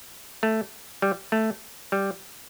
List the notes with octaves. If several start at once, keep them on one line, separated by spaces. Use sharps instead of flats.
A3
G3
A3
G3